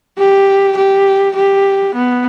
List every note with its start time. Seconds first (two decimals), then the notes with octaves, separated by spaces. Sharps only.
0.18 G4
0.77 G4
1.36 G4
1.95 B3